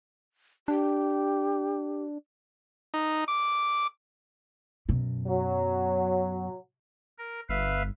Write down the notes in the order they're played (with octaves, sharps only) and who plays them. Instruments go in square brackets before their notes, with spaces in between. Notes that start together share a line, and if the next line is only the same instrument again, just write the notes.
[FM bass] D4 [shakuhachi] G4
[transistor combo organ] D#4
D6
[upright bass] F#2 B2
[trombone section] F#3
[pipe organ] A#4
[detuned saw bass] G1 [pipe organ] B4 E5 F5